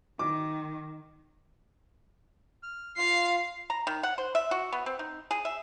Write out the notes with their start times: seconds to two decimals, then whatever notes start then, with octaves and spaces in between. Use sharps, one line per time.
0.19 D#3 D6
2.63 F6
2.97 F4 F5 C7
3.70 A#5
3.87 D#3
4.03 F#5
4.18 C5
4.35 E5
4.51 F#4
4.72 B3
4.86 C4
4.99 D#4
5.31 G#4
5.45 E5